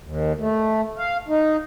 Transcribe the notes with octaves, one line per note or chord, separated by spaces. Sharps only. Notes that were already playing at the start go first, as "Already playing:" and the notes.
D#2
A3
F5
D#4